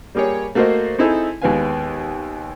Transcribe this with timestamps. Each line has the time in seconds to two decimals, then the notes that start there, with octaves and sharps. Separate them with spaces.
0.15 G3 A#3 G4 G#4 C#5
0.55 A3 A#3 F#4 A#4 C5 D#5
0.99 C4 D#4 E4 G#4 A4
1.42 D#2 G#3 B3 B4 F5 G#5